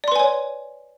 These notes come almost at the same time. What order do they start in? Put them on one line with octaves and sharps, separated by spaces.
D5 C6 B4 G#5 C#5